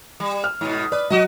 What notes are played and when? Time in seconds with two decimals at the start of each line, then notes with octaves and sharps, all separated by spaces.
0.20 G3
0.44 F6
0.61 G#2 B2
0.92 B4 D5
1.10 F#3 F#4 D#5